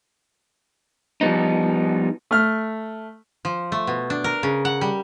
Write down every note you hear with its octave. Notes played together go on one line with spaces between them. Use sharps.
F3 G3 B3 D#4
A3 F6
F3
A3
B2
D4
A#4
C#3
F#5
G3